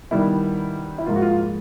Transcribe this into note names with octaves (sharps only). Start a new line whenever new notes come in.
D#3 G3 B3 E4
E4
G#2 F3 A#3 F4
F#4
F4
F4